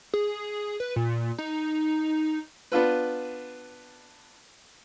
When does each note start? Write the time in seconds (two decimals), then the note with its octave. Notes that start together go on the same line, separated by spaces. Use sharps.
0.14 G#4
0.80 B4
0.96 A#2
1.38 D#4
2.72 B3 D4 F4 B4